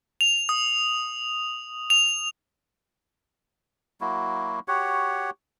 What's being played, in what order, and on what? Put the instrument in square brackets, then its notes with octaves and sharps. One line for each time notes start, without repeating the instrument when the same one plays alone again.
[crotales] F7
D#6
F7
[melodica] F#3 A#3 E4 F#4
F#4 G4 C#5 F#5